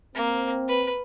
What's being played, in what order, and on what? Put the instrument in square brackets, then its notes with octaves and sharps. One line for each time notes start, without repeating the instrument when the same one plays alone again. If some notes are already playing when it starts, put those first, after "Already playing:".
[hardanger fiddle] A#3 [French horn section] C4
[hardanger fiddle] B4